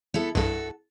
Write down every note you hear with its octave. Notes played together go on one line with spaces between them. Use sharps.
B3 E4 A4
C2 G2 F#4 A4